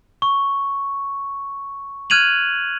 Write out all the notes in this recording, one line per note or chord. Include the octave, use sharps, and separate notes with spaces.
C#6
F6 F#6 G#6 D#7 F7 F#7